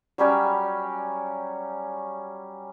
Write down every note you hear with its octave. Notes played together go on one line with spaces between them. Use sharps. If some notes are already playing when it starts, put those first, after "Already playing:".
F#3 G3 C#4 G5